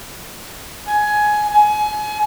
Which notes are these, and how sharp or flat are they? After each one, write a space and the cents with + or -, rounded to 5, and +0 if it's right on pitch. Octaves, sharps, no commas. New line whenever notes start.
G#5 +15
G#5 +30